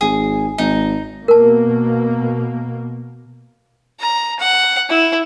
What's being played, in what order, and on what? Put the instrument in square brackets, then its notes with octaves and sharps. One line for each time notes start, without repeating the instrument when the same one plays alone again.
[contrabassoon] G#1 [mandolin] G#4
[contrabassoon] G#1 [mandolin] D#4
[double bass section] B2 A#3 [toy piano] A#4 A5
[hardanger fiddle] A#5
F#5
E4